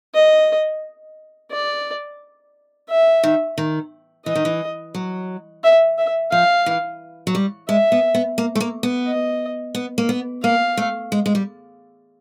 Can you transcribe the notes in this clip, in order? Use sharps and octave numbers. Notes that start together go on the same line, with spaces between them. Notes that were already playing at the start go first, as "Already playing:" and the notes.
D#5
D5
E5
D#3
D#3
E3 D#5
D#3
E3
F#3
E5
E5
F3 F5
E3
F#3
G3
G#3 E5
B3
B3
A#3
A3
A#3
B3
D#5
B3
A#3
B3
A#3 F5
A3
G#3
G#3
G3